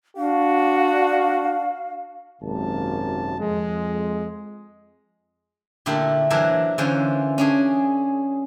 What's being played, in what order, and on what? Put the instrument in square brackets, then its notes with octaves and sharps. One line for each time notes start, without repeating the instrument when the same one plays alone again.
[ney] D4 [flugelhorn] F#4 [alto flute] F5
[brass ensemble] G#1 F#2 C3 A#3 A5
F2 G#3
[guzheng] A#2 D3 A3 E4 G4 A#4
E3 F#3 D4 A#4 C5 E5
D3 E3 C#4 F4 C5
C#4 D4 G#4